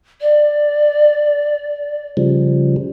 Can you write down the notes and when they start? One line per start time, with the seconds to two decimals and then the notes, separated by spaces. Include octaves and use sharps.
0.21 D5
2.17 C#3 F3 G3